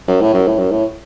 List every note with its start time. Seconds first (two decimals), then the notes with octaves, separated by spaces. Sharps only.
0.08 F#2
0.21 A2
0.34 F#2
0.47 A2
0.58 F#2
0.71 A2